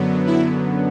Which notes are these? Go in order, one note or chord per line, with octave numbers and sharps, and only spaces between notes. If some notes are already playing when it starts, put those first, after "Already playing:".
Already playing: F#2 D3 F#3 B3
E4